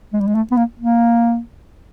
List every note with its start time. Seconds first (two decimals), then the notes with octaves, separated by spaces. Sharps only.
0.13 G#3
0.21 G3
0.27 G#3
0.35 A3
0.52 B3
0.57 A#3
0.79 A#3